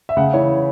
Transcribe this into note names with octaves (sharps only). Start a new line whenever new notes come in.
E5
C#3 F#5
E3 C#5